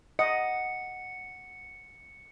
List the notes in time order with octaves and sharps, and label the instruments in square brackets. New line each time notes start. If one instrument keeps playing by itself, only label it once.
[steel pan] D#5 [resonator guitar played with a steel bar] F#5 [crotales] C#7